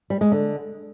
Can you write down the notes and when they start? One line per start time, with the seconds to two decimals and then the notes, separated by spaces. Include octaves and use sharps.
0.10 G3
0.21 G#3
0.32 D3